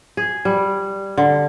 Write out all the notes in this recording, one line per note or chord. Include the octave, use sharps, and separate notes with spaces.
G#4
G3
D3